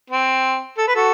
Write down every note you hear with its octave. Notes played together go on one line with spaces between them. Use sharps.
C4
A4
B4
F#4 A4